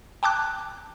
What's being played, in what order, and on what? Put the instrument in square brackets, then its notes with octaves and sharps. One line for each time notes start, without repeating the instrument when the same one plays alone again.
[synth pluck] G5 A5 D6 F#6